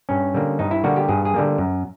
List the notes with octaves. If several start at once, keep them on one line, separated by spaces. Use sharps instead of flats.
G2 C#4
D3 G3 A#3
G2 D#4
E4
D3 G3 A#3 F#4
G4
G2 G#4
G#4
D3 G3 A#3
F#2